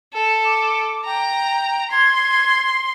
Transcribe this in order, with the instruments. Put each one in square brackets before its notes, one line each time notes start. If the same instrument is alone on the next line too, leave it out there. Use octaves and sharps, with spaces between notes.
[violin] A4
[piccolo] D6
[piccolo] G5 [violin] A#5
[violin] C6 [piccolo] G#6